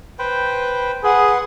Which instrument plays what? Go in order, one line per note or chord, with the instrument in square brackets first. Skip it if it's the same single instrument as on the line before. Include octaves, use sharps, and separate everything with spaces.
[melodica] B4 C5 G5
[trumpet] G#4 [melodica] B4 C6 [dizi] F#5